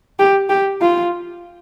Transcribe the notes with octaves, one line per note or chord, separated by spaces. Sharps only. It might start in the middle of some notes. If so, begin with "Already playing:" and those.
G4
G4
F4